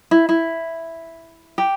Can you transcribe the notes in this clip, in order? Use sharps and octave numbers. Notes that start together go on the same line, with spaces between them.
E4
E4
G4